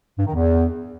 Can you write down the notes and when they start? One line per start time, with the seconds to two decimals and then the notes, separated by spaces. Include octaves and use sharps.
0.19 G2
0.26 D#3
0.34 E2